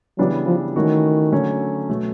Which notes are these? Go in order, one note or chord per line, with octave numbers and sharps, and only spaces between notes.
C#3 E3 F#3 G3 B3 D4
F3
D#3 E3 A3 C#4 F#4
D3 F#3 A3 C#4
B2 F#3 A3